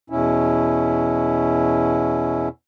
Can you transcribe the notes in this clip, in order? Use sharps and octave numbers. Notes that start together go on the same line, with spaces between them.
E2 B2 C#4 E4